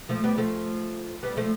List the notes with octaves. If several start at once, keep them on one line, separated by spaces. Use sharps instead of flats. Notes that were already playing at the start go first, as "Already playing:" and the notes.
F3 A3
G3 B3
F3 A3
G3 B3
F3 A3